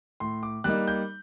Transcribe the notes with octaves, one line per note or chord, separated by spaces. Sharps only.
A2 C6
D6
G3 A#3 D#4 F#6
G6